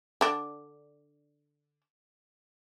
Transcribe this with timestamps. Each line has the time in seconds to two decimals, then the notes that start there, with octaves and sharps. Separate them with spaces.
0.21 D3 D4